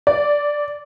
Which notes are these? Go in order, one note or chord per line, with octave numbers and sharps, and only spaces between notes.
D5